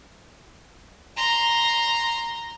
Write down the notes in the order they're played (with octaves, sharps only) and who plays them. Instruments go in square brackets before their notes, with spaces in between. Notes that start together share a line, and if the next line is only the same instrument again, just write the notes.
[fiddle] A#5 C6